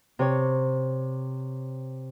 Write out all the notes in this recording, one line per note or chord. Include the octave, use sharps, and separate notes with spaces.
C3 C#5